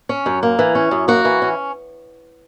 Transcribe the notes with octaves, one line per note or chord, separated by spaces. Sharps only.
C#4
F#2
A#3
E3
C#4
F#2
A#3 F#4
E3
C#4